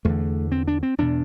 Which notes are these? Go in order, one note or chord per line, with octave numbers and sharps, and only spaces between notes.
E2 D3 A3
C4
D4
C4
E2 B2 D4